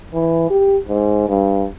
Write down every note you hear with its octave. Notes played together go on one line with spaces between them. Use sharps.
E3
G4
G#2
G2